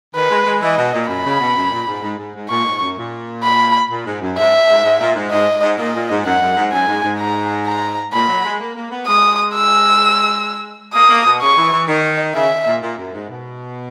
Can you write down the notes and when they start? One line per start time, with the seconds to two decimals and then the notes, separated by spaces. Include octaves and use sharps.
0.15 D#3 B4
0.30 G#3
0.46 G#3
0.62 E3 D#5
0.77 B2
0.93 A#2
1.09 F#2 B5
1.25 C#3
1.40 B2
1.56 F#2
1.72 A#2
1.87 G#2
2.03 G#2
2.18 G#2
2.35 G#2
2.49 A#2 C#6
2.66 G#2
2.81 F#2
2.98 A#2
3.43 B5
3.90 A#2
4.06 G#2
4.21 F#2
4.38 G#2 E5
4.69 G#2
4.84 G#2
5.00 A#2
5.15 G#2
5.31 G#2 D#5
5.62 G#2
5.78 A#2 D#5
5.95 A#2
6.10 G#2
6.25 F#2 F#5
6.41 F#2
6.57 G#2
6.72 F#2 G#5
6.88 G#2
7.03 G#2
7.19 A#5
7.66 A#5
8.13 A#2 B5
8.29 F#3
8.45 G#3
8.60 A#3
8.76 A#3
8.91 B3
9.07 G#3 D#6
9.54 E6
10.94 A#3 D#6
11.09 A#3
11.25 B2
11.42 C#3 C#6
11.57 E3
11.73 E3
11.88 D#3 D#5
12.35 C#3 E5
12.67 A#2
12.82 A#2
12.98 F#2
13.14 G#2
13.29 B2